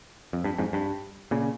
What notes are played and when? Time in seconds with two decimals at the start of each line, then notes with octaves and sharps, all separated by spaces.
0.33 F2
0.44 G2
0.58 F2 G#2
0.73 G2
1.31 A#2 C#3